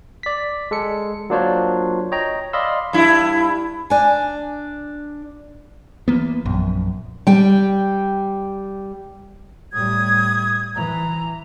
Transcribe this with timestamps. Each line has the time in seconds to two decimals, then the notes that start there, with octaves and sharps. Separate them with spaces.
0.23 D5 B6
0.71 G#3 A4 C#7
1.30 F#3 A#3 D4 F4 C5 C#5
2.12 C#5 D#5 G5 A#5
2.53 D5 D#5 F5 B5 C6 E6
2.93 G2 E4
3.90 D4 G#5
6.08 E3 A#3 B3
6.45 A#1 F#2
7.27 G3 G5
9.73 A2 G3 D#6 G#6
10.76 E3 A#5